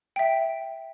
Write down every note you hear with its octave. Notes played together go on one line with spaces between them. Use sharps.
E5 G5